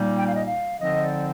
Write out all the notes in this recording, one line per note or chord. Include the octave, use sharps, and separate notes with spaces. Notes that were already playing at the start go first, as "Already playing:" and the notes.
Already playing: A#2 G3 A#3 D#4
G5
F5
D#5
F5
D3 F3 C4 D#4 D#5
D5